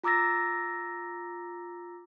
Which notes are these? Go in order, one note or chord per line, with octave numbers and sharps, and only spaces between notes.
F4 A#5 D6 E6 A6 A#6